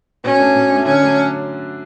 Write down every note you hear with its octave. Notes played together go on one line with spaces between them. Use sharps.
B2 C#4
A3 D4
B2
A3 D4
D3 C#4
F#3 A3 D4